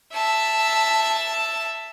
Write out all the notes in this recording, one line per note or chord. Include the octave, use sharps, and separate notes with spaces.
E5 A5